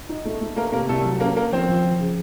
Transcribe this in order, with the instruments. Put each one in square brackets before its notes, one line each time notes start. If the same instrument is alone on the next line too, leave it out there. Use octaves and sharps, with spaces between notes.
[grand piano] D#4
A3
A3
[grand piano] A3 [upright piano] A#3 A#4
[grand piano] C3 [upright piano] A#3 A#4
[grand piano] C2 [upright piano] A3 A4
[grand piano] F#3
[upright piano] A#3 A#4 [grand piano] C#4
[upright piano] A#3 A#4 [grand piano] C#4
[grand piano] F3 [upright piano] C4 C5
[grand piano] F3
F3
C#3